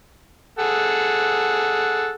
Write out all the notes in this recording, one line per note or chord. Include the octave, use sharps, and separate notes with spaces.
G#4 A4 F#5